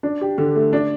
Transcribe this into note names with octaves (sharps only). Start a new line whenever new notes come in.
D4
G4
D3
A3
D4